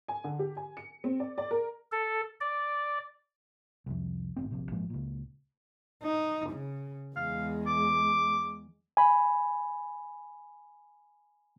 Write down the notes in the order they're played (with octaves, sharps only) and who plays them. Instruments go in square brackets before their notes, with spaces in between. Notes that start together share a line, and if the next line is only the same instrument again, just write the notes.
[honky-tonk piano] G#5
D3
G4
G#5
C#7
C4
D5
D5
A#4
[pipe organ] A4
D5
[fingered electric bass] C2 F2
G#1 A2 C4
D1 A#1 C3
G#1 A#2 F3 G#3
C#2 A#2
[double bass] D#4
C#3
[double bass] E2 G#3 [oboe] F5
[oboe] D6
[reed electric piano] G#5 B5